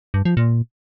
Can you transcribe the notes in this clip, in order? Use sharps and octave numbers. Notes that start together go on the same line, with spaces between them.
G2
F3
A#2